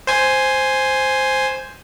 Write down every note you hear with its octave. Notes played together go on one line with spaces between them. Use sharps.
C5 G#5